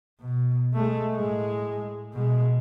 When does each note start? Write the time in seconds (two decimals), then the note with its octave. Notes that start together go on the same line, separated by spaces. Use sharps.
0.20 B2
0.73 G#3 A3
1.15 A2 G#3
2.13 B2 G#3